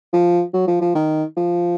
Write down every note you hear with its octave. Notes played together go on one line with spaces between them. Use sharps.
F3
F#3
F3
F3
D#3
F3